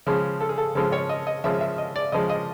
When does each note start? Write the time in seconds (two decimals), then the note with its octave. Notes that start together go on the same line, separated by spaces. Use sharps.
0.07 C#3 F3 G#3
0.41 A4
0.49 G#4
0.58 A4
0.75 C#3 F3 G#3 A4
0.92 C#5
1.09 D#5
1.27 D#5
1.44 C#3 F3 G#3 E5
1.61 E5
1.78 D#5
1.96 D5
2.12 C#3 F3 G#3 D#5
2.30 D#5